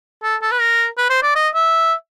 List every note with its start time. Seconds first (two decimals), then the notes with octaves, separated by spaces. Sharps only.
0.23 A4
0.42 A4
0.52 B4
0.60 A#4
0.98 B4
1.10 C5
1.22 D5
1.35 D#5
1.54 E5